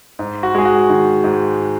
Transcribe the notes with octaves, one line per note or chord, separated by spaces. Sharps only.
G#2
F#4
G#3 G#4
F#4
D#3
G#2